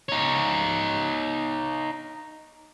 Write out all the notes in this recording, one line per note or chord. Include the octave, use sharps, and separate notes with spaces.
D#4 C#5